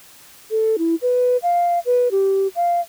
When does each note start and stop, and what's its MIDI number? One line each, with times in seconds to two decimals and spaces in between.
0.51 0.76 69
0.78 0.95 64
1.02 1.37 71
1.43 1.79 77
1.86 2.09 71
2.11 2.48 67
2.56 2.80 77